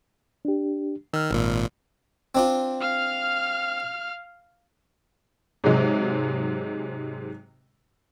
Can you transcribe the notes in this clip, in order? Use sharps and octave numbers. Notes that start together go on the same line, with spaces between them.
D4 G4
D#3 E6 F6
G#1 A#2
C4 D4 F4
F5 F6
G#2 C3 F#3 G#3